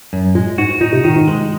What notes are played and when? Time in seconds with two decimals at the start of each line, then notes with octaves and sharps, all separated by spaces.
0.13 F#2
0.35 A#2 G#3
0.58 G#2 F#4
0.81 A#2 D#4
0.93 C3
1.04 A#2 D#3
1.16 G#2
1.27 G#3